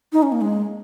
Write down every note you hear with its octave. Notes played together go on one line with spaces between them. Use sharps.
D#4
C#4
A#3
G#3